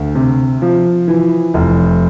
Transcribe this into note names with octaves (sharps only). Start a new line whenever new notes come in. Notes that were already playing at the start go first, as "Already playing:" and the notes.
Already playing: D2
C3
F3
E3
F1